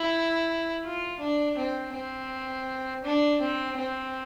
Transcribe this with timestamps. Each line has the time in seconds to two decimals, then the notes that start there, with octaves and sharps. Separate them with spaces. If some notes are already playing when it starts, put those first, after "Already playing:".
Already playing: E4
0.84 F4
1.20 D4
1.57 C4
1.94 C4
3.04 D4
3.40 C4
3.77 C4